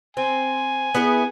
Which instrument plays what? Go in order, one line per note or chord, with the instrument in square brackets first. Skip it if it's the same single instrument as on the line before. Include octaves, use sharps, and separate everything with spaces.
[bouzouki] C4 [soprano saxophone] G#5
[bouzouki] B3 E4 G#4